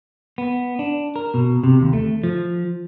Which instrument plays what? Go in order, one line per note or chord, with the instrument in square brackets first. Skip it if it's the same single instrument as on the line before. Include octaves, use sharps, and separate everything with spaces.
[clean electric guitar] B3
D4
A#4
B2
C3
D#2
A3
F3